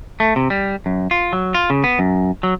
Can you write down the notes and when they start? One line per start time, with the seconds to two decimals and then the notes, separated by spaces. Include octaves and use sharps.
0.20 A3
0.36 C3
0.50 G3
0.86 F#2
1.11 F4
1.33 F#3
1.54 F4
1.70 C#3
1.84 B3
1.99 F#2
2.43 F#3